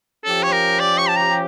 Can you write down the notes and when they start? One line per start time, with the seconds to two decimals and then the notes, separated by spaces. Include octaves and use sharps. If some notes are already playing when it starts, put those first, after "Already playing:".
0.25 F3 C#4 G4 A4
0.43 C#5
0.52 A#4
0.80 D5
0.98 C#6
1.09 A5
1.16 A#5